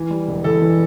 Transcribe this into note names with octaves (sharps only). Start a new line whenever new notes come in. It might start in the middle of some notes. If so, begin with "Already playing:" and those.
Already playing: E3
G3
E1
E2 A4
E3